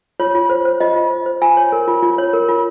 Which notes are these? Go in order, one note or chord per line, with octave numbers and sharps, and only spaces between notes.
F4 C#5
F4
C5
C5
F4 D#5
F4
C5
C5
F4 G#5
C#5
A#4
F4
F4
C#5
A#4
F4